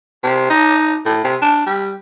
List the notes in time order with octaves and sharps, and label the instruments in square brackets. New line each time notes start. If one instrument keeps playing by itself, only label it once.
[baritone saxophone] C3
D#4
A2
C3
D4
G3